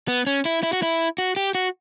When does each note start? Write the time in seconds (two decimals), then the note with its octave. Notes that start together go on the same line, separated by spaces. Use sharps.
0.08 B3
0.27 C#4
0.45 E4
0.63 E4
0.73 F#4
0.83 E4
1.18 F#4
1.36 G4
1.55 F#4